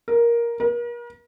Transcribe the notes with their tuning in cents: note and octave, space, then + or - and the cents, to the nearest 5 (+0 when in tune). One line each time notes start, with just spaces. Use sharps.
A#4 +10
A#4 +40